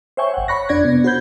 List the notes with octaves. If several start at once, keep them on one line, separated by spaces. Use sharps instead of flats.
C5 C#5 E5 G5 G#5 C#6
G1 F#5
C#5 B5 C#6 F#6 A#6
F2 D4 D5 G#6 A#6
C3 B3
F#4 C5 B5 G6 G#6